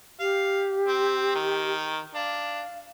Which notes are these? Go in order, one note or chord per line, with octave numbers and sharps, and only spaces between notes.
G4 F5
C4
D#3
D4 F5